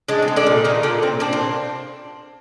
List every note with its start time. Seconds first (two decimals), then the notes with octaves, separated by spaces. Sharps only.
0.08 G#3 D4
0.22 C4
0.28 G#3
0.36 D3 D4
0.47 A#2
0.64 A#2 D#3 D#4
0.83 A#2 D3 D4
1.02 A#2 C4
1.20 A#2 D4
1.33 C4